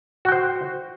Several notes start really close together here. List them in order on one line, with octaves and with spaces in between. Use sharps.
F#4 G5 C5